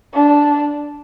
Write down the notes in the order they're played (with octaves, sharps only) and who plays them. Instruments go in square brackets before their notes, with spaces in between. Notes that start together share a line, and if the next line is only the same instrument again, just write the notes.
[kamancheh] D4